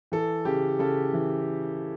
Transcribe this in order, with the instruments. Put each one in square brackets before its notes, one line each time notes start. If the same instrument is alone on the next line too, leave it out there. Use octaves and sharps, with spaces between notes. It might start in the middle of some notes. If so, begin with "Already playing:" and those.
[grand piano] E3 A4
C#3 G4
C#3 A4
E3